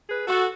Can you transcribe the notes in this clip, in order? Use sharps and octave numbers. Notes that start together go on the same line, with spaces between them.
G#4 B4
F#4 A4